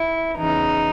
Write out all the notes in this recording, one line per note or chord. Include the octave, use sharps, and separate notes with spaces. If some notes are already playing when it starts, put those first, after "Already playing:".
Already playing: E4
E2 C#3 E3 D#4